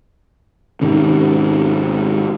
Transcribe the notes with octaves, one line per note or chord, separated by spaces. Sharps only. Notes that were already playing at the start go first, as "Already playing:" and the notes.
G#2 C3 D#3 C#4